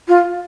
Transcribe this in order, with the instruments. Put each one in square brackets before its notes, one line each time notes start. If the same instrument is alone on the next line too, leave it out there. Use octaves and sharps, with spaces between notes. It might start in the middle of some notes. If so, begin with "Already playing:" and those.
[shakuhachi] F4